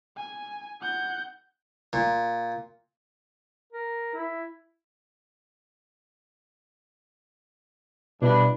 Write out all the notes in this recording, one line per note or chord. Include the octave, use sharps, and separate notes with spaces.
G#5
F#5 G6
A#2
A#4
E4
G2 B2 D4 E4 B4